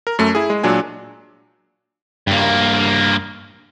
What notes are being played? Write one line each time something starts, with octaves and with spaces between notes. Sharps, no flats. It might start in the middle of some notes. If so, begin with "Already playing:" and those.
A#4
F#2 A3
E4 G#4
G#3
A#2 F#3 D4 G#5
G2 A#3